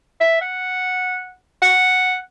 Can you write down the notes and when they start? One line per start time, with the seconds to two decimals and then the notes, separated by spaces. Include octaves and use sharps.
0.21 E5
0.41 F#5
1.62 F#5